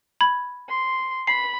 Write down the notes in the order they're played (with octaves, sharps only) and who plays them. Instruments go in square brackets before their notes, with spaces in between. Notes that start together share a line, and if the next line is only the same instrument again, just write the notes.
[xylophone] B5 G#6
[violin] C6
[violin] B5 [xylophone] C7